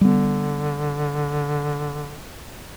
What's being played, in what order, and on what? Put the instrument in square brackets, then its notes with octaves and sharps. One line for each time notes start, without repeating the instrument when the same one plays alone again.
[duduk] D3 [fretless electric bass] G3 B3